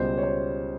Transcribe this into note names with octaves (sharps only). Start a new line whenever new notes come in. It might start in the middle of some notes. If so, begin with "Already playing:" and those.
Already playing: C#2 B2 G3 C5
C#5
C5